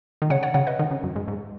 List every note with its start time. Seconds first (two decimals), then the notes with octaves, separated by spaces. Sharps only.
0.22 D#3
0.30 C#3 C#5 F#5
0.43 C#5 F#5
0.54 C#3 C#5 F#5
0.67 B4 D#5
0.79 D#3
0.91 C#3
1.03 F#2
1.16 G#2
1.28 G#2